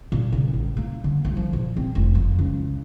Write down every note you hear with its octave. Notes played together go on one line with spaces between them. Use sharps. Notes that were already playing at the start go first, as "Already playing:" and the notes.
A#2
C#3
A1
A#3
D3
D2
F3
A#2
C4
F1
F2
C#2